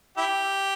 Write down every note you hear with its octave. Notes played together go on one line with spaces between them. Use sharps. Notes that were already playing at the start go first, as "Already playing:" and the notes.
E4 G4